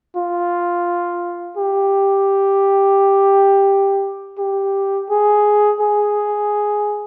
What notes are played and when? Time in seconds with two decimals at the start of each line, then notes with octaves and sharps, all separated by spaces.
0.16 F4
1.57 G4
4.39 G4
5.10 G#4
5.80 G#4